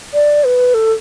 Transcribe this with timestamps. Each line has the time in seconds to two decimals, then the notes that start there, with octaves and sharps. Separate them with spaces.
0.14 D5
0.44 B4
0.74 A4